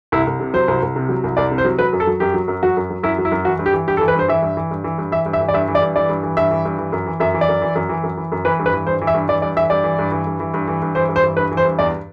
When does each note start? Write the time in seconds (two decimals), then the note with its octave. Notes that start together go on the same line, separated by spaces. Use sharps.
0.12 C2 E4
0.27 C2
0.40 C3
0.54 F#3 C5
0.68 C2
0.82 C2
0.96 C3
1.09 F#3
1.24 C2
1.37 C2 D5
1.51 C3
1.58 C5
1.65 F#3
1.79 F#3 B4
1.93 F#2
2.00 A4
2.07 F#3
2.20 F#2 G4
2.34 F#3
2.48 F#2
2.63 F#3 F#4
2.77 F#2
2.90 F#3
3.03 F#2 E4
3.18 F#3
3.25 E4
3.32 F#2
3.45 E3 F#4
3.59 G2
3.66 G4
3.73 E3
3.87 G2 G4
3.97 A4
4.01 E3
4.08 B4
4.15 G2 C5
4.28 E3 E5
4.42 G2
4.57 E3
4.71 G2
4.84 E3
4.98 G2
5.12 E3 E5
5.26 G2
5.33 E5
5.40 E3
5.48 D5
5.54 G2 E5
5.68 E3
5.75 D5
5.82 G2
5.96 E3 D5
6.09 G2
6.23 E3
6.37 G2 E5
6.51 E3
6.65 G2
6.78 E3
6.92 F#2
7.06 E3
7.20 F#2 E5
7.34 E3
7.41 D5
7.48 F#2
7.62 E3
7.75 F#2
7.89 E3
8.03 F#2
8.17 E3
8.32 F#2
8.45 E3 B4
8.59 G2
8.66 B4
8.73 E3
8.87 G2 C5
9.01 E3
9.07 E5
9.14 G2
9.29 E3 D5
9.42 G2 D5
9.57 E3 E5
9.70 G2 D5
9.84 E3
9.99 G2
10.11 E3
10.27 G2
10.40 E3
10.54 G2
10.68 E3
10.82 G2
10.95 E3 C5
11.09 G2
11.16 C5
11.24 E3
11.37 G2 B4
11.52 E3
11.57 C5
11.65 G2
11.79 E2 D5